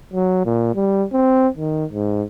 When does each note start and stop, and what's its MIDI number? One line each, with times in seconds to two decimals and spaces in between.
0.13 0.43 54
0.45 0.71 46
0.75 1.04 55
1.13 1.48 60
1.57 1.85 51
1.92 2.23 44